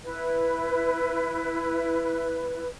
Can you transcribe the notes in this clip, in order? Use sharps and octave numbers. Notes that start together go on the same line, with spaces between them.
E4 B4